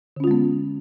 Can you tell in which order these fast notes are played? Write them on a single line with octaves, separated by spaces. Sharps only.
D3 C#4 F4 G#3 B3